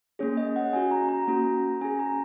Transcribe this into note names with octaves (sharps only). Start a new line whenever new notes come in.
A#3 C#4 G#4 C#5
D#5
F#5
C#4 F#4 G#5
A#5
A#5
A#3 C#4 F#4
C#4 G#4 G#5
A#5